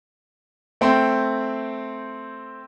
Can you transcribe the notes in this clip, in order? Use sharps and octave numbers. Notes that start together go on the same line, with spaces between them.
A3 C4 G5 C6